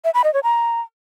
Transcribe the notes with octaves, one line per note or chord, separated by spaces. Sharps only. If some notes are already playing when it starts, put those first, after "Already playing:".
E5
B5
D#5
C#5
A#5